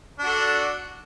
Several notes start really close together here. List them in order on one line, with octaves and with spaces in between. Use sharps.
D4 F#4 A4